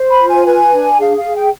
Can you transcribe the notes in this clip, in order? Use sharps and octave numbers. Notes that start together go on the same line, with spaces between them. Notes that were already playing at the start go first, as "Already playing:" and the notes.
Already playing: C5
B5
F4
G#5
B4 G#5
D4
G#4 F5
F5
G#4
G5